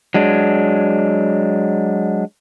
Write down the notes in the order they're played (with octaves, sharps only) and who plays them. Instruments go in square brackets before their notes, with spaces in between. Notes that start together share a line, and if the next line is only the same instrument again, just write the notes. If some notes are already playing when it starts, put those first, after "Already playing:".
[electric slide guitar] F#3 G#3 D4